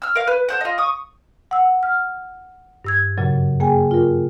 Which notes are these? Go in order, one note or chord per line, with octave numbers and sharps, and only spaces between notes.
E6 F6
A#4 F5
B4
A4 C5 F#5
F4 D#5
C#6 D#6
F#5 E6
F6
G2 E6 G#6
F#2 A#2 C#3 F#3
A#3 G#4 G5 G#5
F4 A#4